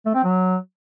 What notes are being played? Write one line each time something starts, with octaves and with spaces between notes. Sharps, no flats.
A3
C4
F#3